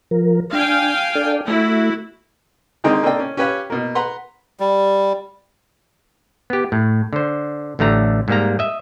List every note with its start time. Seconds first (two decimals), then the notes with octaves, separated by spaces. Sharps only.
0.11 F3 A#4
0.53 D4 F5 G5 G#5
1.15 D4 A4 D5
1.48 A3 E4 F#4
2.84 D3 D#3 G#3 C4 D#4
3.03 A#3 C4 D4 A4 D#5 G5
3.20 C#4
3.37 C#4 G4 B4 C#5 F5
3.70 B2 A#3
3.95 B4 F#5 A#5 C6
4.60 G3
6.50 B3 G4
6.72 A2
7.13 D3 C5
7.79 A1 D3 A3 A#5
8.28 G#2 G3 A#3 A#5
8.59 D#5 E5